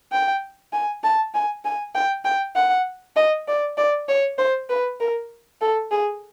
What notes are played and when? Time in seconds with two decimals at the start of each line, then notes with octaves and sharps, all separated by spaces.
0.12 G5
0.73 G#5
1.04 A5
1.34 G#5
1.65 G#5
1.95 G5
2.25 G5
2.55 F#5
3.16 D#5
3.48 D5
3.78 D5
4.09 C#5
4.38 C5
4.70 B4
5.01 A#4
5.62 A4
5.91 G#4